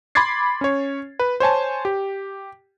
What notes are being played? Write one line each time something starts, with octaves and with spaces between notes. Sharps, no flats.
B5 C6 D6 G#6 A6 C7
C#4 C#5
B4
C5 C#5 G#5 A5
G4